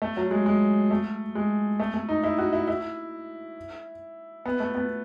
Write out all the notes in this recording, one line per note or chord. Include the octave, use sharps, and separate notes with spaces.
A3
F#3
G#3
G#3
A3
G#3
A3
A3
D#4
E4
F#4
E4
E4
B3
A3
B3